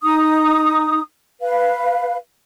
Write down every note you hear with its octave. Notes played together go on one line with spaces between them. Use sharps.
D#4 D#6
B4 F5